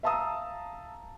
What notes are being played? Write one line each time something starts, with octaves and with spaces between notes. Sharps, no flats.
E5 F5 A5 A#5 D#6 E6